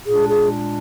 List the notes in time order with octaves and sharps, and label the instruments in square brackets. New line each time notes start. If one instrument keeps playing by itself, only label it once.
[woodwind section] A#2 G#3 D4 [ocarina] G#4
[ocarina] G#4